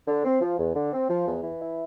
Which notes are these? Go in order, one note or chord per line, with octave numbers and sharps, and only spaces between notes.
D3
C4
F3
E2
D3
C4
F3
E2
E3
E4